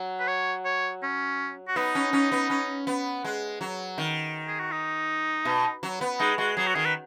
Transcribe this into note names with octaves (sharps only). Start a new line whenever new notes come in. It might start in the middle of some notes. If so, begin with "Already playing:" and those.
Already playing: F#3
B4
C#5
C#5
C#4
F#4
B3 D#4
C#4
C#4
B3
C#4
B3
G#3
F#3
D#3
G#4
F#4
D#4
B2
F#3
B3
G#3 D#4
G#3 F#4
F#3 G#4
F#4
D#3 G#4
B4